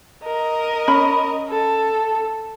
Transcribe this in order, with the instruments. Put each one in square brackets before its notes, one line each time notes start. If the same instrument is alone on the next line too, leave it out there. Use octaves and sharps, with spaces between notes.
[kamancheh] A#4 D#5
[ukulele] C#4 B5
[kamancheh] A4